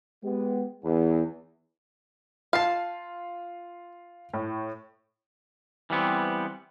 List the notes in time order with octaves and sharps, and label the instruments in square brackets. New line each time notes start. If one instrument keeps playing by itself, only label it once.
[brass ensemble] G#3 B3 G4
E2
[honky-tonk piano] F4 C7 [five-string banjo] F5 A5
[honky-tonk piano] A2
[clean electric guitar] E3 G3 B3 C4